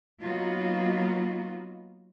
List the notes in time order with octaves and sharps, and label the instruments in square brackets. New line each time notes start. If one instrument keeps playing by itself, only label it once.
[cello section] F#3 A#3 B3 D#4 F4 F#4